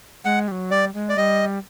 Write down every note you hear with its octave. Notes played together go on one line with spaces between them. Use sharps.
G#3 F#5
G3
F#3
G3 D5
G#3
D5
G3 D#5